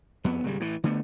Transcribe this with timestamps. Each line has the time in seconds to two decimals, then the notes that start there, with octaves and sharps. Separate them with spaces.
0.24 F2 B3
0.44 G#1 C#3 G3
0.60 A2 E3
0.84 D3 A3 B3